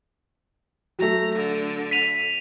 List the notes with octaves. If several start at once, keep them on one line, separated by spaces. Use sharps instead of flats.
F#3 A3 A#5
D3
B6 D#7 F7